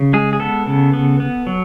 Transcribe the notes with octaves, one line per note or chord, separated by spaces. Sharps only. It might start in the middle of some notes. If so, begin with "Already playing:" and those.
Already playing: C#3
G#3 G#4
G#4
B3 A4
C#3
B3
B3
F#3